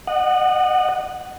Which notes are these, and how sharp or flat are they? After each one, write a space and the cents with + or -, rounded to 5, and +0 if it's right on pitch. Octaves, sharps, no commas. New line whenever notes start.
D#5 -35 F#5 +0